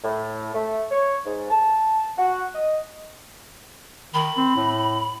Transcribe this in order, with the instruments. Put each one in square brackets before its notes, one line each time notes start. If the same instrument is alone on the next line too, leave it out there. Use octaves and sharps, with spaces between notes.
[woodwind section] A2
A3
C#5
G#2
A5
F#4
D#5
[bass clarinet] D#3 [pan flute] B5
[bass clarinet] C4
A2